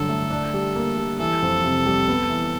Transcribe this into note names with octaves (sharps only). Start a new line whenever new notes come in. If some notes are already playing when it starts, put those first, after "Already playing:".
Already playing: G2 D3 F#3 A4
A3
D4
G3
A#3
G3
E3 A4
F2
C3
G3
B3
E3